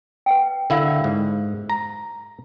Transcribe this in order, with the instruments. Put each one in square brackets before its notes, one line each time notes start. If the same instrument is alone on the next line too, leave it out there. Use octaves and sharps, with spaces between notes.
[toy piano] B4 F#5 G5
[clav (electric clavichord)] D3 E4 [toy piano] A#4 F5 F#5
[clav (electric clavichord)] G#2
A#5